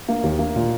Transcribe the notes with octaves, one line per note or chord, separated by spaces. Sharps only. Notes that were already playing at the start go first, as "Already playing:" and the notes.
A#3
D#2
A#3
A#2